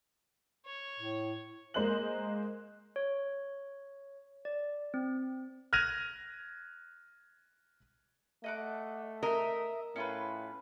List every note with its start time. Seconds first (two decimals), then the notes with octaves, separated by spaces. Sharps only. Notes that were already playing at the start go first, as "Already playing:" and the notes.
0.66 C#5
1.00 A2
1.74 G#3 A#3 C5 D#5 F#6 F#7
2.96 C#5
4.45 D5
4.94 C4
5.73 F6 F#6 G#6 A#6 D#7 F7
8.44 A3 D#5 F#5 D6
9.23 A#4 D#5 E5
9.96 A2 C#4 F4 B4